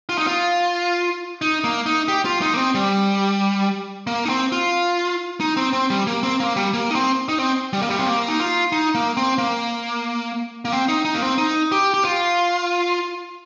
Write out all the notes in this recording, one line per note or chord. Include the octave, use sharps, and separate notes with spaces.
F4
D#4
F4
D#4
A#3
D#4
G4
F4
D#4
A#3
C4
G3
A#3
D#4
C4
F4
D#4
C4
C4
G3
A#3
C4
A#3
G3
A#3
D#4
C4
D#4
C4
G3
A#3
G3
C4
A#3
D#4
F4
D#4
A#3
C4
A#3
A#3
C4
D#4
D#4
A#3
C4
D#4
G4
G4
F4